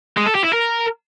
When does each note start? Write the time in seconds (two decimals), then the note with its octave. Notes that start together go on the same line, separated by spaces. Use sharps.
0.17 G#3
0.26 A4
0.35 G4
0.44 E4
0.53 A#4